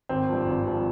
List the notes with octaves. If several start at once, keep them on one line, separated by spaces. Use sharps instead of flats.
G#1 C4
G2 F3
G#1
G2 F3